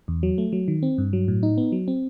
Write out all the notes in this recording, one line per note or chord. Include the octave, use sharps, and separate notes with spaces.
E2
F#3
A3
F#3
D#3
C4
G2
F#3
A2
D#4
B3
F#3
C4